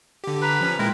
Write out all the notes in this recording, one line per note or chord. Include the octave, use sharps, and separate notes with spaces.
D3 G4
B4 A#5
F3 C#4
A#2 G#3 E4 A#4 G5